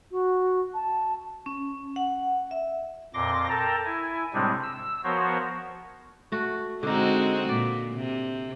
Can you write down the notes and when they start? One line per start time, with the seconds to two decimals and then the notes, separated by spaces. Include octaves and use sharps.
0.11 F#4
0.74 A5
1.46 C#4
1.96 F#5
2.51 E5
3.14 F2 A#2 C6 D6 A#6
3.49 A4 A#4 G5 A5 A#5
3.85 E4 G#5
4.34 A2 C3 G3 G#3 C4 D4
4.63 E6
5.04 F3 B3 F#4 A#4 C5 C#5
6.32 A3 F#4
6.83 D3 G#3 C4 D#4 F#4
7.49 A#2 D5
7.94 C3